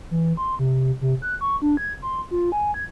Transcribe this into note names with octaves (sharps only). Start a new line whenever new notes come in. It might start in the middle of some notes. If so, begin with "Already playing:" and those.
E3
C6
C3
C3
F#6
C#6
D4
G#6
C6
F4
G#5
G#6